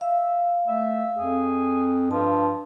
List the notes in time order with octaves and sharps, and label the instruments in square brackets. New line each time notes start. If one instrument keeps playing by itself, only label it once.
[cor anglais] E5 [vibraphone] F5
[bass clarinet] A3 [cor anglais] E5
[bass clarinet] F2 [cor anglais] G#4
[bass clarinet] G2 [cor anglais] F3 [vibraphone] A5